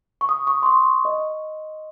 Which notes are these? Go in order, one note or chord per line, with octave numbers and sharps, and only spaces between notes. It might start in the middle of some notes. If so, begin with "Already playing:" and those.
C#6
D#6
C#6
C6
C#6
D#5